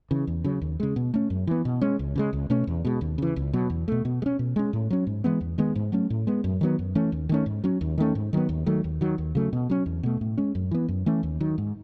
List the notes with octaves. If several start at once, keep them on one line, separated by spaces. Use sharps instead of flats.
C#3 E3
E2
C#3 F#3
D#2
C#3 G#3
B2
A3 C#4
F#2
E3 B3
B2
G#3 C#4
C#2
C#3 E3 G#3
C#2
B2 A3 C#4
E2
B2 G#3
D#2
C#3 E3
C#2
B2 F#3
E2
B2 A3
B2
G#3
C#4
B2
G#3 C#4
A2
F#3 C#4
G#2
E3 G#3 B3
E2
D#3 G#3 B3
G#2
F#3 A3 C#4
A2
G#3 B3
F#2
D#3 F#3 B3
F#2
E3 A3 C#4
D#2
D#3 A3 C#4
G#2
F#3 C#4
D#2
D#3 A3 C#4
G#2
D#3 F#3 B3
D#2
D#3 F#3 A3
D#2
D#3 F#3
D#2
C#3 F#3 A3
B2
F#3 C#4
E2
B2 A3
A2
G#3 C#4
F#2
E3 B3
F#2
E3 A3 C#4
D#2
D#3 F#3
G#2